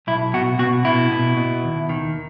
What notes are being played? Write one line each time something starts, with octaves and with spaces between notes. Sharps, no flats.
B1 E4
B2 F#4
B2 F#4
B2 E4
B2
B2
D#2
D#3